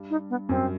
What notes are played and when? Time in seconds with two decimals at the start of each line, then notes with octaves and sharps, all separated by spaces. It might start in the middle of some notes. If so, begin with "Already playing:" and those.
Already playing: G2
0.10 D#4
0.30 B3
0.49 F#2 C4